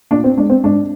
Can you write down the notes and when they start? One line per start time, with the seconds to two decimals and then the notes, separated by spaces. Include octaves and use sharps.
0.11 A#2 D4
0.24 C4
0.37 G#3 D4
0.50 C4
0.64 G#2 D4